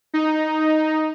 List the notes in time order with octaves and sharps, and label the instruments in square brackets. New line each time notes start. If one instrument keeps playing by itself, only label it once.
[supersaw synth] D#4